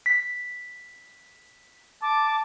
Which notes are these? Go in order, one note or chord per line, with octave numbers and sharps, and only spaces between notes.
B6
A5 D6